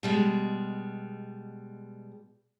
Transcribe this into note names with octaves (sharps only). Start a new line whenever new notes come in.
B2 G3 G#3